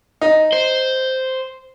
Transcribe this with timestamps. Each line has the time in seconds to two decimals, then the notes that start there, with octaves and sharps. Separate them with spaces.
0.21 D#4
0.53 C5